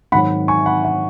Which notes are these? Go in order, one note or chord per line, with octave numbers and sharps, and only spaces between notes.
G#2 D#3 F#3 F#5 B5
G#5 C#6
F#5 B5
F#5